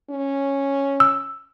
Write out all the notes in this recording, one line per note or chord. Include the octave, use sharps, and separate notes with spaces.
C#4
E6